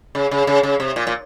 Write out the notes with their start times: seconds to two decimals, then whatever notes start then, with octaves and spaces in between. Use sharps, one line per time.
0.15 C#3
0.31 C#3
0.47 C#3
0.63 C#3
0.80 C3
0.96 A#2
1.07 A#2